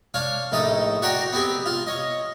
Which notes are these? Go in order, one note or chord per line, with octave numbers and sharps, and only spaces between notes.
D4 C#5 F5
A#1 A2 D#4 A4 D#6
F#4 D5 F#5 G5 A#5 C6
B3 C4 G4 G#4
F4
C#5 D#5